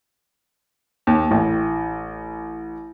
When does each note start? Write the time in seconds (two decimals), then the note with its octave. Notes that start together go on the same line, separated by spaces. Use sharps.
1.07 D#2
1.31 A1